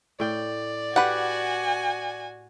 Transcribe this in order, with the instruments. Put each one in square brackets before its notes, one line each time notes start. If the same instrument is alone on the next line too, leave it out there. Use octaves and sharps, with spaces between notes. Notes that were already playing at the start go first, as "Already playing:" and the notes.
[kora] A2 G5 [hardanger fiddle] D5
[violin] F#4 G#5 [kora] G4 [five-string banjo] B4 F#5